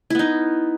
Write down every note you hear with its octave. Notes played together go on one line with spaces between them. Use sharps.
B3 D#4 E4